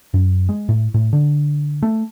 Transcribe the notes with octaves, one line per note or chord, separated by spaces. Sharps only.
F#2
G#3
A2
A2
D3
A3